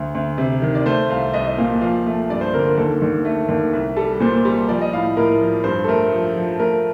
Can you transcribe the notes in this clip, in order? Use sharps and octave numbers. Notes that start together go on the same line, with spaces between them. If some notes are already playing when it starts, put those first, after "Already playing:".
Already playing: D2
D2
C3
D#3
D5
A3 C5
C2 F5
C2 D#5
D#5
A#2 F5
F3 F5
A3
G2 D5
C5
D3 A#4
A#4
D#2 A4
D#2
A3
D#2
C2
G3 A4
A#2 C5
G3
F3 D5
D#5
A2 F5
A2 A#4
F3
G2 C5
A4
A3 A#4
F3
F3
A3 A#4